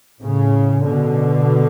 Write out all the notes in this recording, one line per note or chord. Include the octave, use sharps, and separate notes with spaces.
A2 C#3
B2 D3